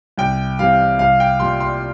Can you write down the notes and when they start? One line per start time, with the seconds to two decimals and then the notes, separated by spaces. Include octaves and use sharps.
0.17 C2 G5
0.59 C3 E3 G3 F5
0.99 C2 F5
1.20 G5
1.40 A#2 G3 C6
1.60 C6